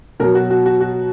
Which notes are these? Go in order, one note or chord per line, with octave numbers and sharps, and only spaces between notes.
B2 F#3 A#4
F#4
F#4
F#4
F#4